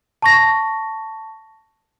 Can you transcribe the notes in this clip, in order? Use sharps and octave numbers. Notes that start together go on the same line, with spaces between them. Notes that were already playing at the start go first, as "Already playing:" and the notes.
A5 C#6 A#6